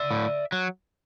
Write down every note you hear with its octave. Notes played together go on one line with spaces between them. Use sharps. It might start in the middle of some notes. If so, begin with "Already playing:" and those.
Already playing: D5 E5
A2
F#3